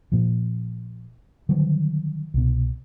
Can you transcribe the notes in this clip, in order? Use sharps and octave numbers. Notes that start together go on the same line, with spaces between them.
A#2 F3
D3 D#3 F#3 G3
C2 B2